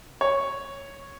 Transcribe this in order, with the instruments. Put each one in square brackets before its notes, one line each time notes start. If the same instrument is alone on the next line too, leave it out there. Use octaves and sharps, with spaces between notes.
[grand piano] C#5